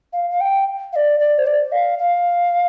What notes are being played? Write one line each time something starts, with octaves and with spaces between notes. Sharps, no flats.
F5
F5
G5
F5
D5
D5
C5
D5
F5
F5